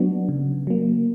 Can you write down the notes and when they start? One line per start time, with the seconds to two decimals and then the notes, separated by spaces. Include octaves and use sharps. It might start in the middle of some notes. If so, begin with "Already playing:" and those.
Already playing: F#3 B3 D4 F#4
0.29 C#3
0.67 F#3 A#3